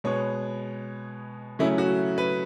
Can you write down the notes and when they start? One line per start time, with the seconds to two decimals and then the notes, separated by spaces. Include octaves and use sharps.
0.04 B2 G#3 B3 C#5
1.59 C#3 F#3 A3 C#4 E4
1.78 F#4
2.18 B4